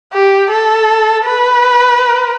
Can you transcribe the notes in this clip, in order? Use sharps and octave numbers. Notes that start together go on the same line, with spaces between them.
G4
A4
B4